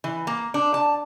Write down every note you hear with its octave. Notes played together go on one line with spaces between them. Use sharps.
E3
A#3
D4
A5